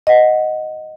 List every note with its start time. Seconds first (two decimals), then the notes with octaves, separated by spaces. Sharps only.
0.07 D#5 F#5